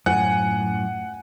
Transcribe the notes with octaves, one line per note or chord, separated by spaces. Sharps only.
F#2 A2 F#5 G#5